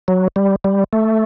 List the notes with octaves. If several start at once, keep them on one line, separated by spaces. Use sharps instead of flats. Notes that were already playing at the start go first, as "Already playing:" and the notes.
F#3
G3
G3
A3